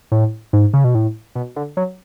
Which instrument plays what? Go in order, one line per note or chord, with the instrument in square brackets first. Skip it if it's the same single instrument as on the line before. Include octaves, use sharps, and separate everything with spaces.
[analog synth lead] A2
G#2
C#3
B2
A2
B2
D3
F#3